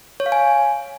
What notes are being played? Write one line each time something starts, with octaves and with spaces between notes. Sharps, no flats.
C#5
F5
G#5